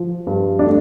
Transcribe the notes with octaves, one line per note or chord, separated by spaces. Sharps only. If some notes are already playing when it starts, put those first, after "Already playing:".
Already playing: F3
G2
D4
A3